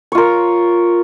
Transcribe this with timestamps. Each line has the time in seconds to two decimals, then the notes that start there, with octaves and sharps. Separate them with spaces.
0.12 C#5
0.15 F4
0.18 A#4